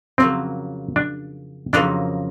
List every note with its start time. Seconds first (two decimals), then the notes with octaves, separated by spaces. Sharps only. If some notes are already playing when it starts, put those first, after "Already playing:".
0.18 F2 C#3 F#3 A#3 C4
0.96 D4
1.73 F2 C#3 F#3 A#3 D4 D#4